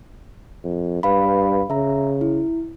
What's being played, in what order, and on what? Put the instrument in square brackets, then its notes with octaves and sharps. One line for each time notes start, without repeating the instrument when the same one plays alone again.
[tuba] F2
[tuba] G2 [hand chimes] B4 F5 B5
[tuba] C#3 [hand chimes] E5 A#5
[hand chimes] E4